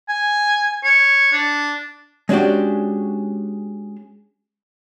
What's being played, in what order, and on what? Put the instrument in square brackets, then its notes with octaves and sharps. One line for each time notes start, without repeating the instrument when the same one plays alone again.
[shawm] G#5
C#5
D4
[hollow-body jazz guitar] G#3 C#4 D4 F#4 G4